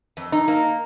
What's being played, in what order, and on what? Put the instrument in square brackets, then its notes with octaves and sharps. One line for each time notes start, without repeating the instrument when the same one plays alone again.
[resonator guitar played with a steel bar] F2
D#4
A#3